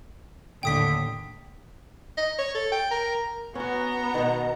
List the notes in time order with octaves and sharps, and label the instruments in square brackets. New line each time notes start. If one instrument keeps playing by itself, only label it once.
[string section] D#2 A2 D3 [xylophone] G5 D#6 B6
[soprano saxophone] D#5
C#5
A4
G5
A#4
[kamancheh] B3 A#5 [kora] C#4 F#4
[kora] B2 D#3